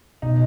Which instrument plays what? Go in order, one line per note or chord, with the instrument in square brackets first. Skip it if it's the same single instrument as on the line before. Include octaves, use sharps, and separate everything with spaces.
[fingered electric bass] B2 [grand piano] D#4